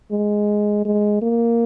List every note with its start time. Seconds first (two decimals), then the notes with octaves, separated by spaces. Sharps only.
0.11 G#3
0.85 G#3
1.22 A#3